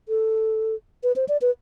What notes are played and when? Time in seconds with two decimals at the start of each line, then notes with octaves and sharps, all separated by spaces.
0.09 A4
1.03 B4
1.16 C5
1.28 D5
1.42 B4